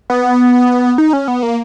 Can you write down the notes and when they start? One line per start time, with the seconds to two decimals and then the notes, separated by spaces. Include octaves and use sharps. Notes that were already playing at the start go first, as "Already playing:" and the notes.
0.10 B3
0.98 D#4
1.13 C#4
1.28 B3
1.43 A#3